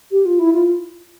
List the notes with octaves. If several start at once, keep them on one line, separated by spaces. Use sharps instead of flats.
G4
F4
E4
F4